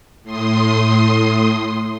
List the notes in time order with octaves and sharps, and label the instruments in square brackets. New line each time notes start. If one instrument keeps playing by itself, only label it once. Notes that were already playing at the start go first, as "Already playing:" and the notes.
[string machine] A2 C6 D#6